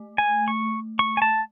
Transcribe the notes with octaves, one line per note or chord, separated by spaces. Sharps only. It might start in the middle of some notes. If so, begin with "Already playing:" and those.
Already playing: A3
G#5
C#6
C#6
G#5
A5